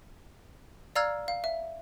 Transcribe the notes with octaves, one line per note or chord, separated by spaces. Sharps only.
D5 F5 A#5 E6 F6 G#6
F5
E5